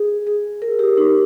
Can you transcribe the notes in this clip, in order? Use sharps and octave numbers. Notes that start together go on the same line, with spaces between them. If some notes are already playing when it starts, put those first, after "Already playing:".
Already playing: G#4
G#4
A#4
G4
D#4